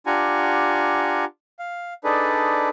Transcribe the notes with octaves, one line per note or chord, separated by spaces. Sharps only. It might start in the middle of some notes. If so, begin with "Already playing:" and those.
D4 F4 G4 F#5 G#5 A#5
F5
D4 D#4 G#4 A4 B4 D5